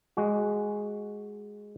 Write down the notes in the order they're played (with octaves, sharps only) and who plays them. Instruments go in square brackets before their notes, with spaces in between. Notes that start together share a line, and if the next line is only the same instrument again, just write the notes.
[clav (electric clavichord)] G#3 F#4